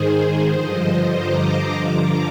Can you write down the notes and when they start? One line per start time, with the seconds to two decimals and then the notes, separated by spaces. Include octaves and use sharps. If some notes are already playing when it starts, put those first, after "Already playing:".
Already playing: G#2 D#3 G#4 C5
0.50 G2 D3 F3 C5 D#5
0.83 C5 D#5
1.13 A#5 D6
1.76 G2 D3 F3